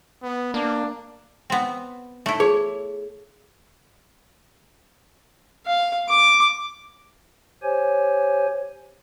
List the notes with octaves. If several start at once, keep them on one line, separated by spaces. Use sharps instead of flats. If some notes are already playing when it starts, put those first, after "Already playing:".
B3
A#3 D4
B3 C4
A3 E4
G#4 C#5
F5
D6
G4 C5 C#5 G#5